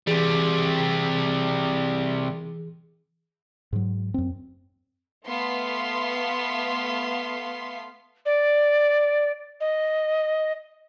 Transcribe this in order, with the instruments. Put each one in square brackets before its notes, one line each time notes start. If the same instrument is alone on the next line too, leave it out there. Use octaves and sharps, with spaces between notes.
[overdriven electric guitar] C3 G3 [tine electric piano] E3 G#4
[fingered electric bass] G#2 F#3
F#2 C4
[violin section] A3 B3 F5 C6 B6
[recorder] D5
D#5